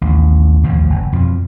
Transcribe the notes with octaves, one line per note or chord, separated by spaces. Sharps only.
A1 D#2
A1 D#2 B2 F3
F#1
F2 B2 F3